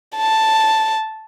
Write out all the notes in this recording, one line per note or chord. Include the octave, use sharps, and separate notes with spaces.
A5